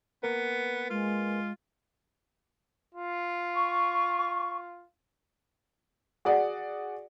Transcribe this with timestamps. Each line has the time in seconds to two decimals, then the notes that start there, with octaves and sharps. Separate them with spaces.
0.23 A#3 B3 A#4 B4
0.90 G#3 F4
2.95 F4
3.54 C#6
6.25 F#4 G#4 D5 F#5